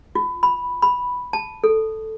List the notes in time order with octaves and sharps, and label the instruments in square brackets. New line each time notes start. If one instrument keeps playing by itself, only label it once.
[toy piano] F4
B5
B5
A5
A4